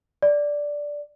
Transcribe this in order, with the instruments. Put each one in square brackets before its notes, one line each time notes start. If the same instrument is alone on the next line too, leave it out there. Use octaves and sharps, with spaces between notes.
[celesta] D5